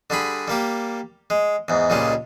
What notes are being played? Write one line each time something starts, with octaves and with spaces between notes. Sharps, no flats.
D3 G3 G#4 B5
G3 A#3 G4
G#3
E2 G#2
C#2 A#2 G3 G#3 C#4